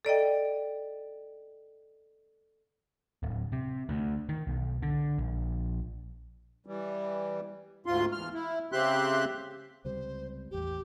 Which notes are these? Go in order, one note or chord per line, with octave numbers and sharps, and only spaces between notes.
A4 D5 D#5 G5
D1
C3
D2
D#3
B1
D3
A#1
E3 G3
D2 G#2 F4 C6
E2 F6
E4
C#3 C4 G4 E5 C6 F#6
C#2 C3 G3 C5
E1 A1 E2 G4